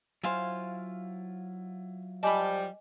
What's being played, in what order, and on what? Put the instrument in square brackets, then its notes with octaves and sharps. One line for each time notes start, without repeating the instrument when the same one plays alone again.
[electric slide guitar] F#3 E4 F4 [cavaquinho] C5 F5 G#5
[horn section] F3 G3 [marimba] D#5 G#5 D6 [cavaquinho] A5 B5